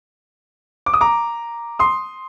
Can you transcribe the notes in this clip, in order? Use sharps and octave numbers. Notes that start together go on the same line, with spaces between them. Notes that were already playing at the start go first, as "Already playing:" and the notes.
D6
D#6
A#5 D6
C6 D#6